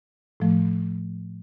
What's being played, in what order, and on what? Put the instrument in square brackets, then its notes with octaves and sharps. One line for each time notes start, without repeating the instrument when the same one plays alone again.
[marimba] A2 F3 A3